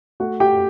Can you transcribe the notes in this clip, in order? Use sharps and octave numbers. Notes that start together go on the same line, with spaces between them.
A3 F#4 F#5
G4 G5